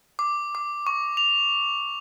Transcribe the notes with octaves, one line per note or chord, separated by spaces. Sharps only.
D6
D6
C#6
F7